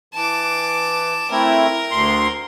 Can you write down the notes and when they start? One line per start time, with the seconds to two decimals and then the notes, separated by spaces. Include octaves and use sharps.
0.14 E3 A5 D6
1.31 A3 C4 E4 A#4
1.91 D2 C6